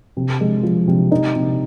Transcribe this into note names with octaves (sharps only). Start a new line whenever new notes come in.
C3
G#3
F3
C3
D#4
C3